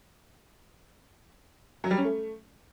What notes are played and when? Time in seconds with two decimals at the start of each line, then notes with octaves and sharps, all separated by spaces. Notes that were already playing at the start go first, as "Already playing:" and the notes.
1.84 F#3
1.91 G3
1.98 C#4
2.04 A3